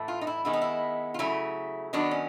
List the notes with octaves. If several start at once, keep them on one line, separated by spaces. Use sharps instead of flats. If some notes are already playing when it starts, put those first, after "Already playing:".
Already playing: A2 E3 A3
F4
D#4
E4
D#3 G#3 B3 E4
D#4
E4
F4
C#3 F#3 A3 E4
D#3 F#3 B3 D4
C#4